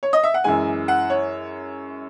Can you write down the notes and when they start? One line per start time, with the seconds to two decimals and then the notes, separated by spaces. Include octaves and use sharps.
0.03 C#5
0.13 D#5
0.23 E5
0.34 F#5
0.44 F#2 E3 G#3 G#5
0.88 F#5
1.10 C#5